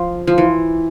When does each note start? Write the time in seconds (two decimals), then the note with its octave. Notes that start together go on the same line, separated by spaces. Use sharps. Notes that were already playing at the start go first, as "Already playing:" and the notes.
Already playing: F3
0.27 F3
0.38 E3